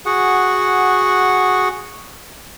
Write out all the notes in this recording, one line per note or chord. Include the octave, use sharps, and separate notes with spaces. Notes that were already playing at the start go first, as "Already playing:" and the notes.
F#4 G#4 F#5